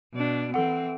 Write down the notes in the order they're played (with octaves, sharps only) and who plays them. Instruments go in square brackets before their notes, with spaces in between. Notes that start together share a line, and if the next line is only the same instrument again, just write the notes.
[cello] B2 D4
[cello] E3 C4 [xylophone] A4 F#5